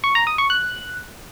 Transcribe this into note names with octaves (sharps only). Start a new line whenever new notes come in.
C#6
A#5
D#6
C#6
F#6